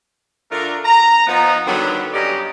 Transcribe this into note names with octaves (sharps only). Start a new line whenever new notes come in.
D3 A3 D4 F4 A#4
A#5
F3 B3 D#4
D3 D#3 F#3 G3 B3
G2 C#4 G4 D5 D#5 A#5